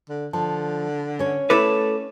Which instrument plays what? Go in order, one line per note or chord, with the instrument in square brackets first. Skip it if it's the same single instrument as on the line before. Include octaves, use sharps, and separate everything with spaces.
[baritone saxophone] D3
[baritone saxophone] D3 [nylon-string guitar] F3 [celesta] A5
[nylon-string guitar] C#4 C#5
[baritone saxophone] A3 [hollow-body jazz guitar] E4 A4 B4 [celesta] D6 E7